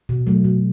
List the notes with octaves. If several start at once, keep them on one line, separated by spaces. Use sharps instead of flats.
B2
F#3 A3
B2